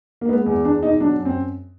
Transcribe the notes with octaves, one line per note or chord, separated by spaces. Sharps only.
A#3
G#3 B3
E2
E2 D4
B2 D#4
F#3 D4
F#2
C4